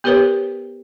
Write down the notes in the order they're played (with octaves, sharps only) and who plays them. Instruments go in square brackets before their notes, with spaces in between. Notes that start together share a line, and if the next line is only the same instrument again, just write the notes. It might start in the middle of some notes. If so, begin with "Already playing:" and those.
[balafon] B3 G4 A#4 B4 C#5